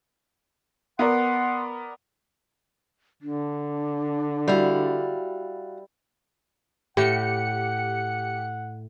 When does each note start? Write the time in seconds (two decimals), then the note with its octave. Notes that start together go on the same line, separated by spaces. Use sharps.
0.99 B3 A#4 D5 F#5 C6
3.22 D3 D4
4.48 G3 E4 F#4 F5
6.97 A2 G4 F#5 C#7